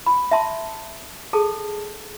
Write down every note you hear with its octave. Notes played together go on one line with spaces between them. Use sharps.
B5
E5 A5 C6
G#4 A4 A5